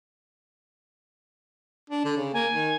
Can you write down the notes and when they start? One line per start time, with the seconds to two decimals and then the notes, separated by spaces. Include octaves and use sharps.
1.90 D4
2.05 D3
2.17 C#3
2.34 A#3 G#5
2.53 D#3